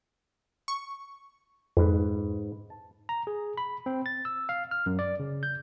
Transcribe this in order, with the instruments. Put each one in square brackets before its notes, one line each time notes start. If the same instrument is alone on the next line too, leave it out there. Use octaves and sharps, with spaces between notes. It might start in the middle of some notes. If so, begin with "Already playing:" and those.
[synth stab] C#6
[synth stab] F2 [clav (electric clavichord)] G#2 B4
[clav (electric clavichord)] A5
[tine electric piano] A#5
G#4
B5
C4
A6
E6
F5
F6
F#2
D5
C#3
G6